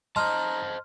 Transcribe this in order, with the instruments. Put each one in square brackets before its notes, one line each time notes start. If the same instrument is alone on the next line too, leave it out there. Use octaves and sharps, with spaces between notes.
[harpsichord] D#4 [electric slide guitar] C5 D#5 A5 [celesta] C6 F6